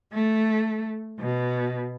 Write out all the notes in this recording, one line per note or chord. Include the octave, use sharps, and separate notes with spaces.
A3
B2